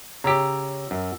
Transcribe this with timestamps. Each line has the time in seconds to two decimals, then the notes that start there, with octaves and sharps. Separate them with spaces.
0.24 C#3 G4 A#5 E6
0.91 F#2